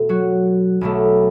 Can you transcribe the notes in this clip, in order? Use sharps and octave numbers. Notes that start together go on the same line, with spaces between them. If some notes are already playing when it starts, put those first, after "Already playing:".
Already playing: E1 B2 A3 A4
F#3 F#4
B1 B2 A3